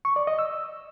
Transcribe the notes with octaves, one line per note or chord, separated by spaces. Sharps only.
C#6
D5
D#5
E6